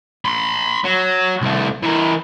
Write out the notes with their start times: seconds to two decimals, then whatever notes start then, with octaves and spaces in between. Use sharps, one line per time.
0.25 B5 C6
0.84 F#3
1.42 C2 A3
1.83 E3 A#4